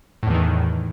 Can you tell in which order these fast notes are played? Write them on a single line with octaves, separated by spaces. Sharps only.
A2 E2 E3 D#3